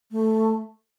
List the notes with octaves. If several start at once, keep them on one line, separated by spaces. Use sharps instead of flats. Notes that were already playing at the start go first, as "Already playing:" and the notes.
A3